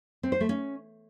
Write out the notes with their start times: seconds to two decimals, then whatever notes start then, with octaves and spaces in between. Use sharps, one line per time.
0.23 C4
0.32 C5
0.41 A3
0.49 C#4